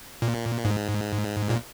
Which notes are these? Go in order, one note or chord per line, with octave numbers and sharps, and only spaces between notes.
A#2
G#2
A#2